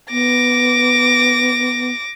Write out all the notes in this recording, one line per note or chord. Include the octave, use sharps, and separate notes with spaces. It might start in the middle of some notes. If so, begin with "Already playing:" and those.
B3 D6 A#6